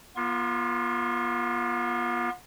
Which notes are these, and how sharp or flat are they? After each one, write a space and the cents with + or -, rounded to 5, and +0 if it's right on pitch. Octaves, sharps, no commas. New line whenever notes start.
B3 -40 F4 -5 C6 +45